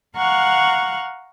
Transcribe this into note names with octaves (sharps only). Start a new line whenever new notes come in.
F5 F#5 A#5 C#6 F6 F#6